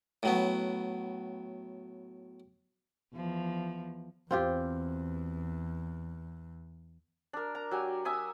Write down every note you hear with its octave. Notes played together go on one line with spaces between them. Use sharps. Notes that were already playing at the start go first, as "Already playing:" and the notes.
A2 F#3 B3
E2 F3
E2 C4 F4 G4
D4 A#4
A#5
F#3 G4 G#5
E5 G#5 D#6